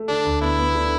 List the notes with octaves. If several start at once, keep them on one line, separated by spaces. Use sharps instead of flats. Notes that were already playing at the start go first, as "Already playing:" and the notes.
Already playing: A3
D3 D4
D2
B3 E4
B3
D3